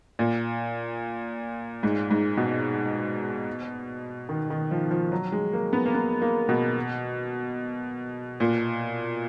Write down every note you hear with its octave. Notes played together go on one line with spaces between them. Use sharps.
A#2
G#2
G#2
B2
D#3
D#3
F3
F3
F#3
G#3
A#3
B3
A#3
B3
A#3
B2
A#2